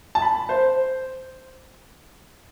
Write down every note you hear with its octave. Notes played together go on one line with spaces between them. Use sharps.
A5
B5
C5